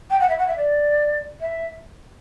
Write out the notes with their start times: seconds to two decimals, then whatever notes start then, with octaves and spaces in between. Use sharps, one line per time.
0.10 G5
0.20 F#5
0.28 E5
0.38 F#5
0.47 E5
0.57 D5
1.40 E5